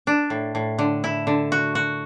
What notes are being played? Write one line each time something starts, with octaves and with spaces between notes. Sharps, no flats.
D4
A2
A2
D3
E4
D3
F#4
F#4